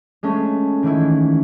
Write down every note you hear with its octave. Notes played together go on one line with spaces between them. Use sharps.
G#3 A3 C#4
D#3 E3 E4